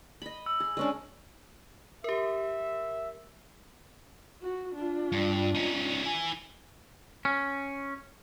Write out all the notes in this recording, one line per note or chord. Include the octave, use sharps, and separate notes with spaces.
D#5 B5
E6
G#4
G#3 C#4 D4
G4 A#4 E5
F#4
D4 F4
G2
C#4 D#4
E4 G#5
C#4